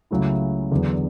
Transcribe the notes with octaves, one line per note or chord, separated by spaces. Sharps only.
C#2 C#3 F#3 A3 E4
E2 D3 F#3 B3 D4